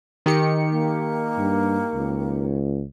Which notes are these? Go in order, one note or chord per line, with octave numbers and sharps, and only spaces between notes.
D#3 G4 C#7
A#3
G2
C#2